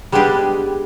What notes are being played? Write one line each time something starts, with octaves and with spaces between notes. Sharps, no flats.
G3 G#3 B3 D4 G4 G#4